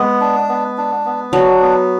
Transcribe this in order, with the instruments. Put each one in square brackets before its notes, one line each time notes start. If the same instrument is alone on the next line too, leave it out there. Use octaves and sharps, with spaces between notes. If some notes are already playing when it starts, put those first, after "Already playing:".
Already playing: [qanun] G#3 [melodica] B3
[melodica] D4
B3
D4
B3
[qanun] F#3 [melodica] D4
[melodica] B3